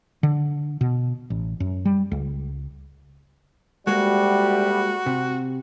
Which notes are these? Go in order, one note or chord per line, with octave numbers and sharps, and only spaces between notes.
D3
B2
A1
F#2
G3
C#2
D2 G3 G#3 A#3 F#4
C3